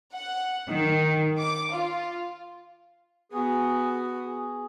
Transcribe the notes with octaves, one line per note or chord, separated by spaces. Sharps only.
F#5
D#3
D6
F4
B3 F#4 G#4
G#4